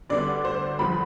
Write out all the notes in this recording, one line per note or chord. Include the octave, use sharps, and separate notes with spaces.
D2 D3 G3 B3 D5
C5
E2 D3 F3 B5